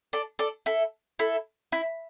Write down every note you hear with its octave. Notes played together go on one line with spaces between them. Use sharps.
A4 D5
A4 D5
E4 A4
E4 A4
E4